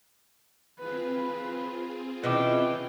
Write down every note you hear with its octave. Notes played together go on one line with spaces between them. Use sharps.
C4 F4 G#4 B4
B2 C#4 E4 B4 G5 D6